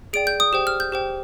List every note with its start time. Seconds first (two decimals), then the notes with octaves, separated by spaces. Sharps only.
0.13 G#4 D5 G5 D7
0.27 G6
0.40 D#6
0.53 G4 C5 G5
0.67 F6
0.80 G6
0.92 G4 C5 G5